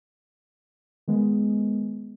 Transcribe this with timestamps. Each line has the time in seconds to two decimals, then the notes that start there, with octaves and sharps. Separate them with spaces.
1.08 D#3 G#3 B3